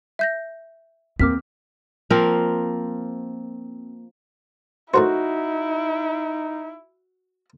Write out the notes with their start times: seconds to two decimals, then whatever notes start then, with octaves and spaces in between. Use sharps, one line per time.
0.19 E5 G6 A#6
1.20 E2 A#3 C4 D6 F6 B6
2.10 F3 A#3 C4 A#4
4.94 A2 D#4 E4 F#4 A#4 C5